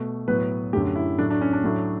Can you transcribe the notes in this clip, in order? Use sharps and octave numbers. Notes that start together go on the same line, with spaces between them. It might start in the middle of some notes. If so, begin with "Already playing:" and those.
Already playing: B2 A3
A2 F#3 B3 B4
F#2 D3 A3 G4
E4
A2 F#3 A3 D4
D4
C#4
D4
A2 F#3 A3